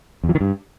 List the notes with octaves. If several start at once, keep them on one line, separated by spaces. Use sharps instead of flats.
E2
F3
D#3
G2